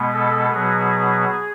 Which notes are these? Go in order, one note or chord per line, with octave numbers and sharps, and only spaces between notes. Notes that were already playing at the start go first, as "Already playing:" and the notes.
Already playing: B2 G#3 B3
A4
B2 F#3 B3 G#4